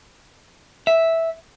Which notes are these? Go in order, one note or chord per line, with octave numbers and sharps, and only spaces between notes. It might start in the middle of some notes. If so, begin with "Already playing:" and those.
E5